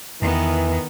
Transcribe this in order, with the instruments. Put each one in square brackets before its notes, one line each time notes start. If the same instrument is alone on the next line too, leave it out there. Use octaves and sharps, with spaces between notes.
[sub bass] E2 [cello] D#3 B3 [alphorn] E3